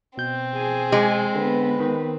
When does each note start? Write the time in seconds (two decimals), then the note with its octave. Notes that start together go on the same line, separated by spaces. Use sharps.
0.18 B2 C4 G6
0.55 G#4 G#5
0.92 G#3
1.35 D3 B3 B4
1.80 D#3